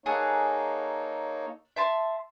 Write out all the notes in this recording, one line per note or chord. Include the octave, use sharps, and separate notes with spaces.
A#3 D#4 G#4 A4 C#5 F#5
E5 A5 C6